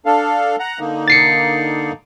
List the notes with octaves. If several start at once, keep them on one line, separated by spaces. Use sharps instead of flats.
D4 A4 F5
F#5 A#5
D3 A#3 D#4
A6 C7 C#7